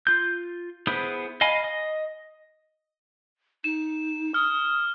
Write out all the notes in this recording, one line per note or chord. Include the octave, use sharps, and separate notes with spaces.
F4 G6
B3 E4 G#4 B4 C5
D#5 F5 G#5 B5
D#5
D#4 E7
D#6 F6